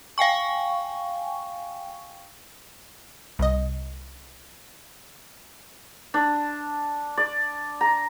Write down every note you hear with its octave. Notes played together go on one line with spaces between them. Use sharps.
F5 G5 G#5 C#6
C2 D#5
D4
D5
A#5